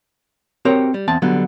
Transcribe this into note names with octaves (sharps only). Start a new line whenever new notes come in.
C4 F#4 G4 A#4 C#5
G3
E2 C4 A5
D3 F#3 G3 B3